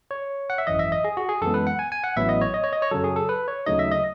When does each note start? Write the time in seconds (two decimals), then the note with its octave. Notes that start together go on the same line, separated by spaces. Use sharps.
0.11 C#5
0.50 F#5
0.58 E5
0.67 G#1 F#2 E3 D#5
0.79 E5
0.92 D#5
1.04 G#4
1.17 F#4
1.29 G#4
1.42 F#2 E3 G#3 B3 A4
1.54 B4
1.67 F#5
1.79 G#5
1.92 G#5
2.04 F#5
2.16 A1 A2 F#3 B3 E4 E5
2.29 D#5
2.41 C#5
2.54 D#5
2.64 C#5
2.73 D#5
2.82 C#5
2.91 F#2 C#3 F#3 A4
3.04 G#4
3.16 A4
3.29 B4
3.48 C#5
3.66 D#2 C#3 F#3 A3 D#4 D#5
3.79 E5
3.91 D#5